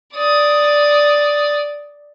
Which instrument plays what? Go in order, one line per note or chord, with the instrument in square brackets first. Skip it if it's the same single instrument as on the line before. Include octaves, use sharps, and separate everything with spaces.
[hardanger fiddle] D5 D#6